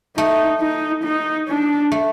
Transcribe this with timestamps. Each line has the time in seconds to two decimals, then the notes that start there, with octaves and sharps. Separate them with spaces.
0.17 A3 D#4
0.61 D#4
1.04 D#4
1.48 D4
1.92 A3